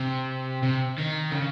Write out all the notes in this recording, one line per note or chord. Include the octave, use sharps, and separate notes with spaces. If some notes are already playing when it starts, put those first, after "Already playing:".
Already playing: C3
C3
D#3
C#3